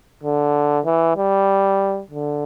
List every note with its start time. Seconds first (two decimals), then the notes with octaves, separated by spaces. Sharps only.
0.23 D3
0.85 E3
1.17 G3
2.10 D3